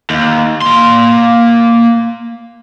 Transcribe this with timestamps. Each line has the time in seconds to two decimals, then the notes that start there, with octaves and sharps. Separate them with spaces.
0.10 D#2
0.62 A#3 C6